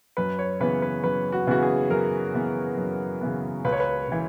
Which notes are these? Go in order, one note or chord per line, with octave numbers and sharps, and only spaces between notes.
F#2 B4
C#5
C#3 E3 B3 B4
B4
F#2 B4
F#4
C#3 E3 B3 F#4
G#4
F#2 A#4
C#3 E3 B3
F#2
C#3 E3 B3
C#2 B4
C#5
B4
C#3 E3